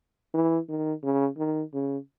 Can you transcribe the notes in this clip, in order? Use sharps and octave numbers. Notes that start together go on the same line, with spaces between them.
E3
D#3
C#3
D#3
C#3